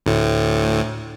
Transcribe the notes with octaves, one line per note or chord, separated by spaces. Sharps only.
D2 A2